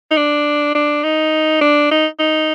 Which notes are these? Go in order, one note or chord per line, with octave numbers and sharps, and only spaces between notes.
D#4
D4
D4
D#4
D4
D#4
D#4